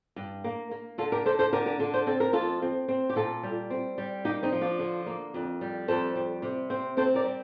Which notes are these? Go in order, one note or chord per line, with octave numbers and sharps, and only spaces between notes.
G2
A#3
A#3
D3 F4 A4
G4 A#4
D3 A4 C5
A4 C5
D3 G4 A#4
G4 A#4
D3 F4 A4
A4 C5
C4 A4
A#4
F2 F4 A4
C4
C4
G4
A#2 F4 A4
G3
C4
G3
A#3 D#4 G4
C4 D#4
F3
D4 F4
D3
A#3
F2
G3
F2 A4 C5
G3
C3
C4
C4 A4 C5
A#4 D5
G3